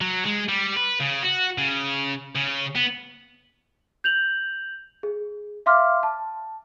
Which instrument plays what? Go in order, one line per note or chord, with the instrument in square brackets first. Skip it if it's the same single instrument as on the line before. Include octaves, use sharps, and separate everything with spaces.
[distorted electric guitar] F#3
G#3
G3
B4
C#3
F#4
C#3
C#3
B3
[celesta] G6 F7 F#7
G#4
E5 F5 C6 D6 F6
A5